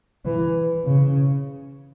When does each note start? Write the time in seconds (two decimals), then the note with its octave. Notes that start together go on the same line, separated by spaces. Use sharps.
0.25 E3
0.85 C#3